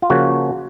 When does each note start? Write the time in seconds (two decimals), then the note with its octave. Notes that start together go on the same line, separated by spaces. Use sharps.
0.02 F4
0.10 C#3 F3 A#3 F#4